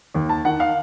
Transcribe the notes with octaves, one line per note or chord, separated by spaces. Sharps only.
D#2
A5
D#3 F#5
F5